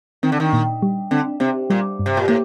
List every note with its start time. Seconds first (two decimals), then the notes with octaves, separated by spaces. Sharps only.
0.23 D#3 C4
0.32 D3
0.40 D#3
0.53 A#2
0.82 G3
1.11 D3 C4
1.40 C3 C4
1.70 A#2 G3
1.99 G2
2.06 C3
2.17 A#2
2.28 A2 A#3